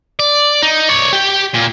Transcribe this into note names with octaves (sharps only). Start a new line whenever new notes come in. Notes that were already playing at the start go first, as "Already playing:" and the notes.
D5
D#4
C#5 D5
G4 G5
A#2